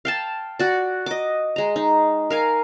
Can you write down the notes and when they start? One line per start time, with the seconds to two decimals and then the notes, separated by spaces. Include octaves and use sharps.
0.05 F5 G5 A5
0.59 F#4 D5
1.06 D#5 D6
1.56 G#3 A#5
1.76 D#4
2.30 A#4 F5 G#5